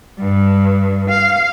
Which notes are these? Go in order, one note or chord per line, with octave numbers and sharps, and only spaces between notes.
G2
F5